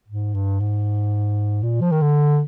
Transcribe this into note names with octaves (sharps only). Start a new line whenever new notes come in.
G#2
G2
G#2
A#2
F3
D#3
D3